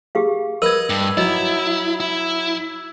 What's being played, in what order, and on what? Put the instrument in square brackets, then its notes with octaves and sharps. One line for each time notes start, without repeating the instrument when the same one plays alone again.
[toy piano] G4 G#4 F5
[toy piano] A#4 [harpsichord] B4 D#5 D#6 [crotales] E6 G#6
[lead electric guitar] G2
[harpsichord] F#3 D#4 [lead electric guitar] E4 [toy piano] D#5
[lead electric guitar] E4